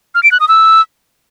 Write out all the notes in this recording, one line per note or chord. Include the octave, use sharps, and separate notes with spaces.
F6
D7
F#6
D#6
E6